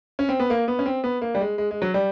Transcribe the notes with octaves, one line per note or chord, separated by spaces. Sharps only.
C#4
C4
B3
A#3
B3
C#4
C4
B3
A#3
G3
G#3
G#3
G#3
F#3
G3